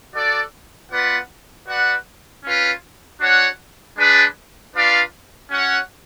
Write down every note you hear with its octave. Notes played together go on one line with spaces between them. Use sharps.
F#4 A4 D5
B3 F4 B4 D5 F#5
F#4 B4 D5 F#5
C#4 F4 B4
D4 F#4 C#5 F#5
G#3 D4 G#4 B4 D5
D4 F4 B4 D5 F5
C#4 F#4 C#5 F#5